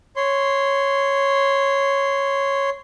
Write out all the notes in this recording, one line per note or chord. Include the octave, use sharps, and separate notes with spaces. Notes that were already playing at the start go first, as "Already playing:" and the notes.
C#5 C6